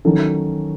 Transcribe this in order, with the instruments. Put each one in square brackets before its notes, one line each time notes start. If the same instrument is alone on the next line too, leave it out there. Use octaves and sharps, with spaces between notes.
[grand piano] D#3 F#3 C#4 F#4 A4